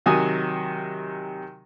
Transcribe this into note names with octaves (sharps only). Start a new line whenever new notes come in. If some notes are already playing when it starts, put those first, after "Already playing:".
C3 D#3 F#3 G#5 D#6